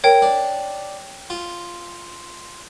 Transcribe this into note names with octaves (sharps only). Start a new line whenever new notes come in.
A#4 C#5 G5
D4
F4